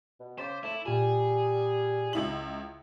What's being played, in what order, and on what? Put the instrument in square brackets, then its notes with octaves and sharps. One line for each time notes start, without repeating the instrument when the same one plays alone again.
[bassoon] B2
[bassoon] C#3 [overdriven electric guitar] C5 [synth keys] D6 A6 B6
[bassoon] A3 [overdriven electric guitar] E4
[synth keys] A#2 F4 [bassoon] G3 [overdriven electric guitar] G#4
[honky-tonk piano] C#2 E4 F#7